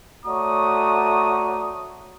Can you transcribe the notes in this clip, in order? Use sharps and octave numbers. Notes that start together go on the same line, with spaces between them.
A3 F#4 C#5 D5 A#5 D#6